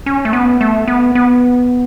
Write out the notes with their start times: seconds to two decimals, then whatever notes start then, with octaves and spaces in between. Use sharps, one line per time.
0.06 C#4
0.25 A3
0.33 B3
0.61 A3
0.87 B3
1.15 B3